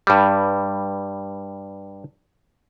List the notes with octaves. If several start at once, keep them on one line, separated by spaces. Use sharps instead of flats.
G2 G3